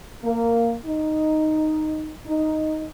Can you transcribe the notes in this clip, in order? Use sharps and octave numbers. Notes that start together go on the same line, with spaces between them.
A#3
D#4
D#4